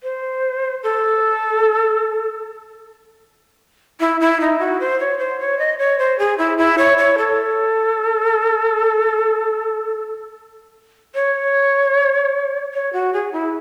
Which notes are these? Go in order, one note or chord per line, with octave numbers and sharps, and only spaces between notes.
C5
A4
E4
E4
D#4
F#4
C5
C#5
C5
C#5
D#5
C#5
C5
G#4
E4
E4
C#5
C#5
A4
C#5
C#5
F#4
G#4
E4